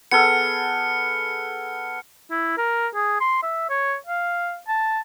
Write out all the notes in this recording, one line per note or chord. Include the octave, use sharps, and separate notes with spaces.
B3 G#4 A4 F6 C#7
E4
A#4
G#4
C6
E5
C#5
F5
A5